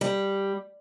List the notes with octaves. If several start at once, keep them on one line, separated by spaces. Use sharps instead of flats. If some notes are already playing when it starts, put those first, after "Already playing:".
G3